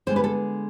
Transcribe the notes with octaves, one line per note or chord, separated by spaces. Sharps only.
D3 G#3 B3 C5
B4
A4